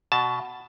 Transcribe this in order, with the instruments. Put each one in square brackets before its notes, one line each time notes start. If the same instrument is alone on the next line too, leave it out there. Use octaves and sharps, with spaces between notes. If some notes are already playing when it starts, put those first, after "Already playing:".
[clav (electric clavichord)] B2 A5